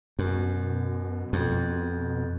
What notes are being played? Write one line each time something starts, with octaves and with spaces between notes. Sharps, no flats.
F#2 B2
F2